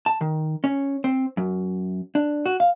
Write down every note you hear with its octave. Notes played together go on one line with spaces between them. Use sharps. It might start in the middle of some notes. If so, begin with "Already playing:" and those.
A5
D#3
C#4
C4
F#2
D4
F#4
F5